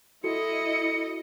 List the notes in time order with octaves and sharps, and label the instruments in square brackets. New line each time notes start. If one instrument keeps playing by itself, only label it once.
[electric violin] E4 D#5 [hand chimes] F#4 A4 [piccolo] C#7